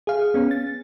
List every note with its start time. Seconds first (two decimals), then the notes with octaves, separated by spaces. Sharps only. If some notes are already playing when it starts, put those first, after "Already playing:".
0.07 G#4 F5
0.34 B3 C#4
0.51 A6